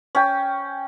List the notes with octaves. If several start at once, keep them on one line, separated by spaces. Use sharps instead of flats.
C#4 G5